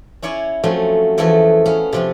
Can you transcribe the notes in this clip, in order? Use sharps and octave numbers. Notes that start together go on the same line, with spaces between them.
C#4 E4 C#5 D5 G#5
F3 F#3 A3 C4 C#4
E2 E3 F3 A3 A4 G#5
B3 C#4 F5
C3 F3 C4